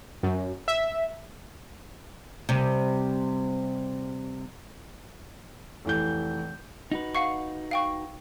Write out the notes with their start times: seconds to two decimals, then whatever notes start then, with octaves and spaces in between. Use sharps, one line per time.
0.23 F#2
0.68 E5
2.49 C3 G3
5.85 F1 E3 G6
6.92 D#4 F#4 B4
7.15 F5 F#5 C#6
7.71 F5 G5 C#6